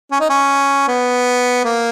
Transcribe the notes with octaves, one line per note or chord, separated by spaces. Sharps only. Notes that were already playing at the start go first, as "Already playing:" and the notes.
C#4
D#4
C#4
B3
A#3